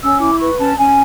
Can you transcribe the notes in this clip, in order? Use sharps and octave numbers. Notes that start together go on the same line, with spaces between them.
C#4 E6
E4 D6
B4 C#6
C#4 A5
C#4 G#5